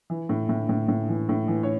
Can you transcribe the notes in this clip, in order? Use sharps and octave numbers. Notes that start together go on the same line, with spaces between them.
E3
A2
A2
A2
A2
E3
A2
E3
C#5